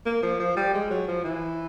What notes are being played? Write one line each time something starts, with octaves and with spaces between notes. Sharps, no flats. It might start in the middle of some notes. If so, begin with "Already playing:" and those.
A#3
F3
F3
G3
G#3
F#3
F3
E3